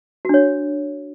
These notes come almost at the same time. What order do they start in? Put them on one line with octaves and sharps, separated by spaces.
F#4 D4 C#5